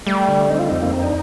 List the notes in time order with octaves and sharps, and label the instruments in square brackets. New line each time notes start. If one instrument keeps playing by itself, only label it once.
[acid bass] G3 [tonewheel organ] A3
[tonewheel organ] D3
[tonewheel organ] C4 [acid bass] D#4
[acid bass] F4
[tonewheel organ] F2 [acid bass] D#4
[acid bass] A#3
[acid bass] C4 [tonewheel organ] D#4
[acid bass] D4